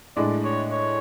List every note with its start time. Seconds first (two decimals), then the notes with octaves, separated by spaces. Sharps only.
0.16 A2 G#3 D4 D5
0.44 C#5
0.72 C#5